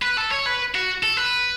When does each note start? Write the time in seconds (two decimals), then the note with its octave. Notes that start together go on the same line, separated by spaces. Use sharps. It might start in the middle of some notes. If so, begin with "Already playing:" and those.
0.03 B4
0.17 A4
0.31 C#5
0.46 B4
0.75 F#4
1.03 A4
1.17 B4